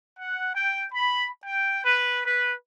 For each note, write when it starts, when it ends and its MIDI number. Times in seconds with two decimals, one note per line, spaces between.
0.18 0.52 78
0.53 0.85 79
0.93 1.28 83
1.44 1.79 79
1.83 2.21 71
2.24 2.52 71